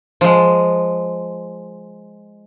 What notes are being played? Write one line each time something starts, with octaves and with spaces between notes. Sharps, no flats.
F3 G#3